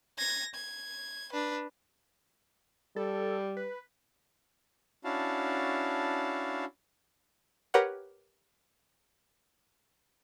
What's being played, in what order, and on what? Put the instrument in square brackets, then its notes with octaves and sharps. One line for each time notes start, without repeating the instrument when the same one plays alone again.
[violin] G#6 A#6
G#6
D4 B4
[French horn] G3 [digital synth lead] A4
[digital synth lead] B4
[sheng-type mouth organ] C#4 D4 E4 F#4 F5 A5
[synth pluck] G4 A#4 B4 C#5 F#5